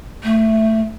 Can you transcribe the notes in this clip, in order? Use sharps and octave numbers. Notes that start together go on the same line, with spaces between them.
A3